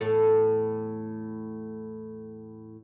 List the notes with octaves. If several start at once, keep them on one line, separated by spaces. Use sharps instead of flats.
E2 A2 A4